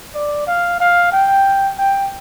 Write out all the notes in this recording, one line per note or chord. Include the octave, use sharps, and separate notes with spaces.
D5
F5
F5
G5
G5